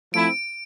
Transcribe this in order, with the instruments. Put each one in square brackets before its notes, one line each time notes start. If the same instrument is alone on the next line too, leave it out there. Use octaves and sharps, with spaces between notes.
[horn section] F3 A3 C4 E4 [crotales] D7